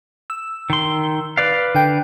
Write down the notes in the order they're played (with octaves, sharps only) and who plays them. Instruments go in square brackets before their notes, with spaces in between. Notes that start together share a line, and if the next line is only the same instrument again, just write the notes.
[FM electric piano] E6
[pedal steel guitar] D#3 C6
B4 D5 F5
[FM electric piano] D3 G5